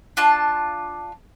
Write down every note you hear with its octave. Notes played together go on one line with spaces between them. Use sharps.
D4 F4 A5